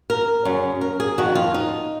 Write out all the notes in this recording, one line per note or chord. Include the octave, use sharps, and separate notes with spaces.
A#4
F#2 C#3
A#4
G#4
F2 D#3 F#4
F4
D#4